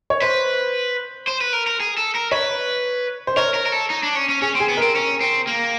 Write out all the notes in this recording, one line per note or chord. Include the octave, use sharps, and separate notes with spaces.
C#5
B4 C5
C5
B4
A#4
A#4
G#4
A4
A#4
B4 C#5
C5
A#4 C#5
A#4
A#4
A4
D#4
D4
C#4
C#4
C#4 G#4
C4
G#4
B3
C4 A#4
C#4
C4
A#3